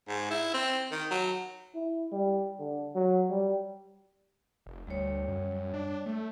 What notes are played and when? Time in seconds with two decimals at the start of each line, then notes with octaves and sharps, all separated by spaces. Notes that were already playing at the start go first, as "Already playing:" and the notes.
0.08 G#2
0.30 E4
0.54 C4
0.91 D#3
1.11 F#3
1.75 E4
2.12 G3
2.59 D3
2.95 F#3
3.30 G3
4.66 F1
4.87 D2 G3 C#5
5.28 F#2
5.74 D4
6.06 A3